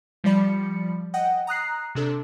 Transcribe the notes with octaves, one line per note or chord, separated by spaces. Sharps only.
F3 G3 D5 B5 C#7
D#5 F#5 G5
A#5 D#6 F#6 C7
C3 D4 A4